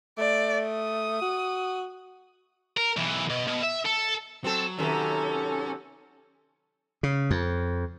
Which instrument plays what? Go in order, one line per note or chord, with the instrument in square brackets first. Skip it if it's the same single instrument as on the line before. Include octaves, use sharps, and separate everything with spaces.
[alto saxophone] A3 [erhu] D5
[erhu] D#6
[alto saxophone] F#4
[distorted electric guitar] A#4
B1 E3
B2
B2
E5
A4
[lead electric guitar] F#3 [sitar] C4 A4
[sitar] C3 D#3 F#3 [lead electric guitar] C#4 [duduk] A4
[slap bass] C#3
F2